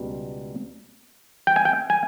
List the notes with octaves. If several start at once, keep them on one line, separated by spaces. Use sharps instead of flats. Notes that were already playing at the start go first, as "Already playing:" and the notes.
Already playing: C#2 B2 G3
G5
G#5
G5
G#5